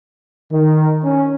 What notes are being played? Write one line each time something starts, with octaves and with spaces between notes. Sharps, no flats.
D#3
C#4